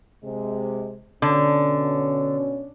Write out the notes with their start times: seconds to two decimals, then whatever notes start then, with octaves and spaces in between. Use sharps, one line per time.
0.23 C3 G#3
1.22 B2 D3 C#4